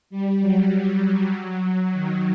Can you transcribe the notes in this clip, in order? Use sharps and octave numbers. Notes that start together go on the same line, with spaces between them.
G3
F#3
D#3